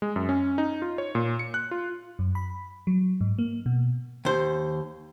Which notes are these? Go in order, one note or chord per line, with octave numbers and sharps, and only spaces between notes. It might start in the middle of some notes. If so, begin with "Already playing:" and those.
G#3
F#2
C#4
D#4
F4
C#5
A#2
C#7
F#6
F4
F#2
B5
F#3
G#2
A#3
B2
D#2 C5